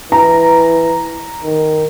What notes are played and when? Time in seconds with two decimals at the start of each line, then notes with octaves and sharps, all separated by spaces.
0.12 E3 A#5
1.44 D#3